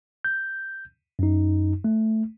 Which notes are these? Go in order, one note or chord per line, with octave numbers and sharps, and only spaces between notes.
G6
F#2 D#4
A3